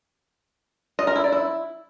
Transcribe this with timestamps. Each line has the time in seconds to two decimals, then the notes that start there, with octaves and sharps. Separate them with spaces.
0.99 D#5
1.07 A#4
1.16 E4
1.24 D5
1.32 E4